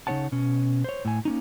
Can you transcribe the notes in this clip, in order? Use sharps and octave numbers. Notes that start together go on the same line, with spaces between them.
C#3 B3 D#4 C#5 F#5 A5
B2 C#4
C5 C#5
A2 G#5
A#3 C#4 D#4